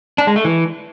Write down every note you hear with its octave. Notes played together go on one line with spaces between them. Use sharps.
D4
G#3
A3
E3